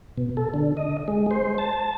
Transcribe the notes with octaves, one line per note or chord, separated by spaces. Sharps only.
B2
A4
D3
D#5
G#3
C5
A5